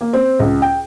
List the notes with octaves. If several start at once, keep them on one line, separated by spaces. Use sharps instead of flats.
A#3
C4
C#2
G5